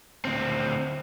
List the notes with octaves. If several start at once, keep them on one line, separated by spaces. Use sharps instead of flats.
D2 C4